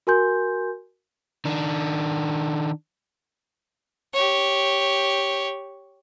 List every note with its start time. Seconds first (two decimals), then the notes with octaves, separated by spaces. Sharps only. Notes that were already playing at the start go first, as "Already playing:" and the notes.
0.07 F#4 A#4 G#5 C6 G6
1.45 D#3 D4
4.14 G4 C#5